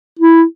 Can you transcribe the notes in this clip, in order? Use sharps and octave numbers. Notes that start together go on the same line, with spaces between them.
E4